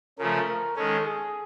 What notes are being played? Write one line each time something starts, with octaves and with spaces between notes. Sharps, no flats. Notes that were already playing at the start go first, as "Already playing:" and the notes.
C#3 F3 A3 A#4
A#4
D#3 G#3 C#4 A4
G#4